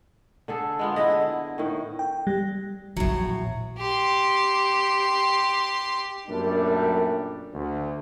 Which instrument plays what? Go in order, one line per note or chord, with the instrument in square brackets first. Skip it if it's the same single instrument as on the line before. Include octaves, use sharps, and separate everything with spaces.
[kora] D3 G#4 A4
G#3 B3 F4
[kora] D3 B3 E4 [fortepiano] D#5
[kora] A2 D#3
[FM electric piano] G5
G3
[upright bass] A#1 E2 [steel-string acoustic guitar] A2 F#3
[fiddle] G4 C6
[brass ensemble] F#2 A#2 G3 A3 D4
D2